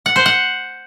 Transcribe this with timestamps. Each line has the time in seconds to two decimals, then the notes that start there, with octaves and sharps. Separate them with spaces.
0.06 F#5
0.16 C5
0.26 F#5